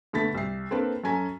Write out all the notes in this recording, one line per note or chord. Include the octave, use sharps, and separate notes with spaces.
B2 D3 A3 B5 A6 B6
C2 C7
A#3 C4 D4 A4 B4
F#2 C#4 A4 G#5 A#5 B6